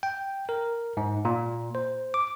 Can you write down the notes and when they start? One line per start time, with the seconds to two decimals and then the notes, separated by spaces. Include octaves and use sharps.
0.03 G5
0.49 A#4
0.97 G#2
1.25 A#2
1.75 C5
2.14 D6